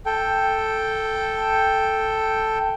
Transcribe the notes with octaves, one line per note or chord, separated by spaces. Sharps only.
A4 G5